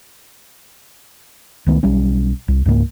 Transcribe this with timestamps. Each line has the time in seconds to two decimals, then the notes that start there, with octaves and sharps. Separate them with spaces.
1.66 C#2 D#3 A3 B3
1.83 B1 G3 C#4
2.48 C2
2.66 C#2 G#2 G#3 A#3